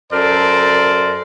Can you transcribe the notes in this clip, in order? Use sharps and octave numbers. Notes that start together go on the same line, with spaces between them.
F#2 A4 A#4 C5 D5